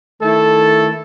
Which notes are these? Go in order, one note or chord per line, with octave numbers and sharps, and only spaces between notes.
D#3 A3 E4 A4